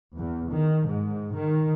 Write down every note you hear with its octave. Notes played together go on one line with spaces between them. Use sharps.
E2
D#3
G#2
D#3